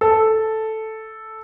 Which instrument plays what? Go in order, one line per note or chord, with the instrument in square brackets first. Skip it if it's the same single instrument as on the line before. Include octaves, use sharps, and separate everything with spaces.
[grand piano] A4